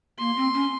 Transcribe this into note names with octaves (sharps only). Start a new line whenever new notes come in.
A#3 C6
C4
C#4